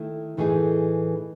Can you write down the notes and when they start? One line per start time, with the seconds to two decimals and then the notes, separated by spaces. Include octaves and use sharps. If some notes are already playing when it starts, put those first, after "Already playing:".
Already playing: D#3 A3 E4
0.37 A2 E3 A3 D#4 G#4